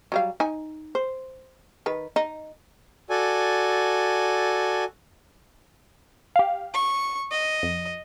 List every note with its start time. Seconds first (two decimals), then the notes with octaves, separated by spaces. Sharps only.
0.12 F#3 G3 F5
0.40 D#4 G#5
0.95 C5
1.86 D#3 B4
2.16 D#4
3.10 F#4 A4 D5 G#5
6.36 G4 F5
6.74 C#6
7.32 D#5
7.63 F2